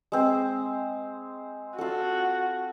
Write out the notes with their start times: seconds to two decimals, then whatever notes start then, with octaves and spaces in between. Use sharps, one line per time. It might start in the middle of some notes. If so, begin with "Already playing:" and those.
0.12 G#3 C4 C5
1.78 F4 F#4 A4